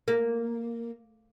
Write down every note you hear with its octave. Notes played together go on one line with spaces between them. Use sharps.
A#3